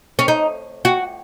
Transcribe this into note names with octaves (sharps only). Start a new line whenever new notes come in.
C#4
D#4
F#4